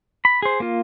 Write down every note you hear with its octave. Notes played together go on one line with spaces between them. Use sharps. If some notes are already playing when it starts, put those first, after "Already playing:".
B5
G#4 C5
A#3 F4